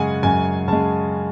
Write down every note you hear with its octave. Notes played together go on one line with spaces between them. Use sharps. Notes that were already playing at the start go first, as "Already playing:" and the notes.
Already playing: F#2 C#3 G#3 F#5 G#5
F#2 G#5
C#3 G#3 A5